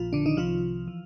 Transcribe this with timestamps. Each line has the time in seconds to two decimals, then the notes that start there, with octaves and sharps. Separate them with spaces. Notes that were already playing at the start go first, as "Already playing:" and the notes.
Already playing: A#1 A#2 F3 F4
0.13 D3 D4
0.26 D#3 D#4
0.37 C2 C3 D#3 F3 F4
0.88 E3